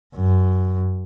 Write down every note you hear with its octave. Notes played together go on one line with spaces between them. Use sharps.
F#2